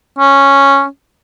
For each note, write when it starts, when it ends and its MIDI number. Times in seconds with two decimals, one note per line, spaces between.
0.19 0.85 61